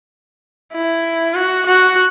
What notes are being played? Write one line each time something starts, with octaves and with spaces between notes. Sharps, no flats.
E4
F#4
F#4